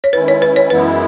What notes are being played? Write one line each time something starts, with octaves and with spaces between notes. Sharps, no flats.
C#5
D#3 G#3 C#4 E4 B4
C#5
B4
C#5
F#2 E3 G#3 B3 E4 B4